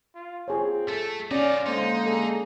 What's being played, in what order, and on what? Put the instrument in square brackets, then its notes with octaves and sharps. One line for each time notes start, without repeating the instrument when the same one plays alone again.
[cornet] F4
[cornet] C4 [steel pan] F4 G#4 C#5
[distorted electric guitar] A3 [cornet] A4
[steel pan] C#4 [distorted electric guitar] D#4 F4 [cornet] D5
[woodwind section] D3 G#3 A#3 [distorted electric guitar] D#4 [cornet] C5
[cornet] G#4 [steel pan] A4